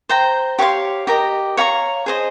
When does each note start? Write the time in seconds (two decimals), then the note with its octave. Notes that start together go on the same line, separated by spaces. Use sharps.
0.09 C5 G5 A#5
0.59 G4 C#5 F5 C6
1.07 G4 A#4 D#5
1.57 C#5 F5 A#5 C#6
2.06 G#4 C5 D#5